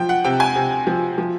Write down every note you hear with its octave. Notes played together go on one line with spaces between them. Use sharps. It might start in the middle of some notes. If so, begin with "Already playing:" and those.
Already playing: F3 F#3 G5
F#5
C3 G5
G#5
C3
F3
F3